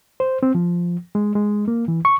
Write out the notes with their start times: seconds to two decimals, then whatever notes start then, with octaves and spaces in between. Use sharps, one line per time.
0.20 C5
0.43 C4
0.55 F3
1.15 G#3
1.35 G#3
1.68 A#3
1.88 E3
2.05 C#6